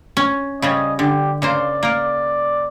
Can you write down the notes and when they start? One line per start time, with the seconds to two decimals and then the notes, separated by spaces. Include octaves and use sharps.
0.17 C#4
0.62 C#3 G3 C#4 D#5
0.99 D3 G4
1.42 C#3 A#3 C5 D5
1.83 A#3 A#4